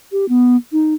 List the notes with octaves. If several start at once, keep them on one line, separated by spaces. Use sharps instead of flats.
G4
B3
D#4